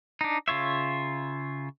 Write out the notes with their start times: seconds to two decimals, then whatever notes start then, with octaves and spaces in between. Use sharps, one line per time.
0.21 D4 D#4
0.48 C#3 F4 C#5 E5